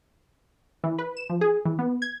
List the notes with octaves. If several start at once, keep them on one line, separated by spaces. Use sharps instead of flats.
E3
B4
E7
F3
G#4
E3
B3
G#6